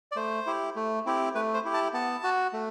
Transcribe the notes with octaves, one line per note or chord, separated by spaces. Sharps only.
D5
A3 C5
E4 G4
A3
C4 E4 G4
A3 B4
C5
E4 G4
A5
B3 A5
F#4
A3